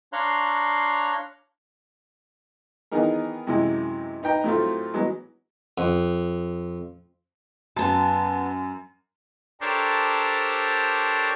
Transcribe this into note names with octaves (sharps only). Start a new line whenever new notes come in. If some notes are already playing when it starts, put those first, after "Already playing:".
D4 C#5 F5 A#5 C6 F#6
D#3 E3 B3 D#4 G#4 A#4
F#2 C3 E3 G#3 E4
D#4 B4 G5 A#5
A2 F#3 A3 C4 F4
E3 F#3 G#3 B3
F2
F#2 B3 A5
D4 G4 A4 A#4 C5 C#5